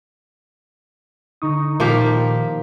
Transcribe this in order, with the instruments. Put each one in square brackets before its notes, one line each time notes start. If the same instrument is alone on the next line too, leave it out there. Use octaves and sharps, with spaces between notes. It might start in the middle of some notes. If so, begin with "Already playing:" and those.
[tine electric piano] D3 C#6 D#6 [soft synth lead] D#4
[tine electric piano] A#2 D#3 B6 [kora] F3 A#3 G4